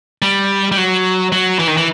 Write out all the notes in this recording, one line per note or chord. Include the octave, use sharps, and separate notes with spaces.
G3
G3
F#3
F#3
E3
D#3
E3